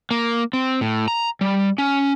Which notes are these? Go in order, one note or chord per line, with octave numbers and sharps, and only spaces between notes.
A#3
C4
A2
A#5
G3
C#4